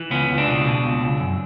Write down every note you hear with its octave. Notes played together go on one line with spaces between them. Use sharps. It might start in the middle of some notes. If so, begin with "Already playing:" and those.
Already playing: E3
C#2 B3 C#4
C#2
C4 D4
B2
B2
C#2
C#2
F#2